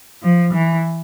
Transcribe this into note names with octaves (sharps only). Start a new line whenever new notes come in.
F3
E3